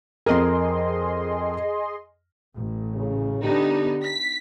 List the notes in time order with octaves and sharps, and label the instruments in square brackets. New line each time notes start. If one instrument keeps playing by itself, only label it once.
[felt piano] F2 A#4 [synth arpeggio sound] G#4 D#5 C6
[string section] A1
[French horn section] C#3
[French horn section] D3 G4 [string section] B3 D4 D#4
[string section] B6